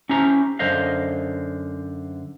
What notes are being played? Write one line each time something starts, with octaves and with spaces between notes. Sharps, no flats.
C#4 E4 G4 C5 A#5
F#2 D3 C5 D#5 F5